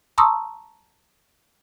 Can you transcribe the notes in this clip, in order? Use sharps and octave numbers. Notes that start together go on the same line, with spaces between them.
A5 A#5 C6 C#6 D#6 E6